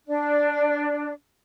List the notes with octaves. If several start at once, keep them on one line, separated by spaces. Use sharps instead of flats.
D4